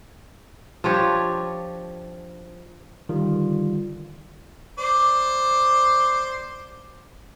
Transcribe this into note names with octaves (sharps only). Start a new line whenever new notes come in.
F3 D4 G4 C#5
D3 D#3 G3 F4
C5 D5 D6